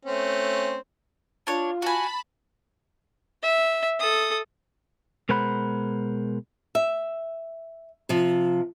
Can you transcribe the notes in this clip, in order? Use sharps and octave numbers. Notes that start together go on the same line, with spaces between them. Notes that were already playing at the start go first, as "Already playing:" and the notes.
A3 C4 C#4
D4 F4 C#5
F#4 G#5 A5 B5
E5
A4 D#6
B2 G#3 A#4 C5 F#5 B5
E5
C3 F3